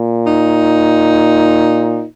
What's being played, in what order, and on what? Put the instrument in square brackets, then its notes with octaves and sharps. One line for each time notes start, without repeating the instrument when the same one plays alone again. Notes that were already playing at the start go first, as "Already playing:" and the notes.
Already playing: [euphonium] A#2
[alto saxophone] D#4